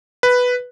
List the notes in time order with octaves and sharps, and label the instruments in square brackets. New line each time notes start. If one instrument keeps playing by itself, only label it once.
[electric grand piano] B4